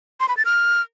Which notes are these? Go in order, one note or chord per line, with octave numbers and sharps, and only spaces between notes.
C6
B5
A6
F6